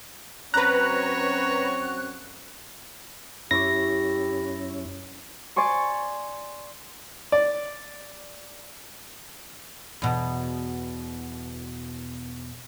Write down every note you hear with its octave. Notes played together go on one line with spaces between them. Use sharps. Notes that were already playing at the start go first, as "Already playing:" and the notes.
F#2 C4 C#4 F#4 B4 C#5 A#5 F#6
F#2 C#4 E4 G4 C#6 D6 A#6
D5 G#5 C6 C#6
D5
E2 B2